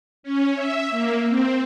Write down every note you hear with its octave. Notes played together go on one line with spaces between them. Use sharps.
C#4
E5
A#3
C4